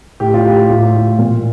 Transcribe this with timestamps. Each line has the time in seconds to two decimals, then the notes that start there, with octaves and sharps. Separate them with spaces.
0.20 A2 G4
0.34 F4
0.45 A2 G4
0.69 A2 F4
0.94 A2
1.19 A#2